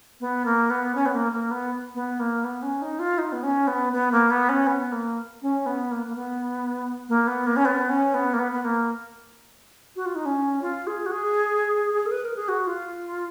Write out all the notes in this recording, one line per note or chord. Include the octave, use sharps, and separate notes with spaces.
B3
A#3
B3
C#4
B3
A#3
A#3
B3
B3
A#3
B3
C#4
D#4
F4
D#4
B3
C#4
B3
B3
A#3
B3
C#4
B3
A#3
C#4
B3
A#3
A#3
B3
A#3
B3
A#3
C#4
B3
C#4
B3
A#3
B3
B3
A#3
F#4
F4
D#4
C#4
F4
G#4
F#4
G#4
A#4
B4
A#4
G#4
F#4
F4